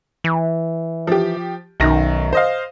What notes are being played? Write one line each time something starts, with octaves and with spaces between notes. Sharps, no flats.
E3
F3 G4
B1 F#2 D#3 A#6
C5 D#5 F5